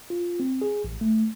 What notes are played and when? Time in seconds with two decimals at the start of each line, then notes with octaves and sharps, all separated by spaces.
0.10 F4
0.40 C4
0.62 G#4
0.84 A1
1.01 A3